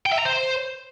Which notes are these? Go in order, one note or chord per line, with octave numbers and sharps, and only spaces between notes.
G5
E5
A#5
C5